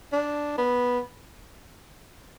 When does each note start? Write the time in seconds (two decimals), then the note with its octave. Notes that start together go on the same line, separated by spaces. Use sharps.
0.13 D4
0.58 B3